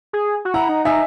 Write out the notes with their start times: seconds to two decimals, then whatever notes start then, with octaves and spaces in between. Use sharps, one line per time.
0.13 G#4
0.45 F#4
0.54 E4 F#5 A#5
0.69 D#4
0.85 D#4 E5 G#5